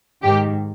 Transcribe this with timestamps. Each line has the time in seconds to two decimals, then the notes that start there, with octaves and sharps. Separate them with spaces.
0.23 G#2 D#3 G4